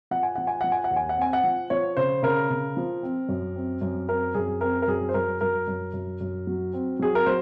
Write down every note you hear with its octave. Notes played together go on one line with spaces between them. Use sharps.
F3 F#5
G#5
F3 F#5
G#5
F3 F#5
G#5
F#5
D#2
G#5
F#5
C4 G#5
F#5
F3
F3 C#5
C#3 C5
C#3 A#4
C#3
F3
C4
F#2
C4
F#2
C4 A#4
F#2 G#4
C4 A#4
A#4
F#2 G#4
C5
F#2 A#4
F#2 A#4
F#2
F#2
F#2
F#3
C4
F#3 G#4
A#4
F#3 C5